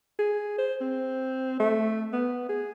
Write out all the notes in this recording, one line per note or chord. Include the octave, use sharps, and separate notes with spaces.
G#4
C5
C4
A3
B3
G#4